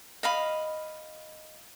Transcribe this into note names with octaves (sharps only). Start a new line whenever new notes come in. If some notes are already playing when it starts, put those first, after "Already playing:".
D#5 F5 B5